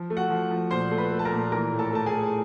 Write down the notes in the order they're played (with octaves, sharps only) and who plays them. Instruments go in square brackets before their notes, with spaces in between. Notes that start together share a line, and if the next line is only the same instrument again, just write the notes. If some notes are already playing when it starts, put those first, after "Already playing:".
Already playing: [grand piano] F3
A3
F#4 F#5
F3
F3
A#2 C5 C6
A3
B4 B5
A3
A5
A#4 A#5
A#2
E3 A#4 A#5
A2
A4 A5
A3 A5
G#4 G#5
A3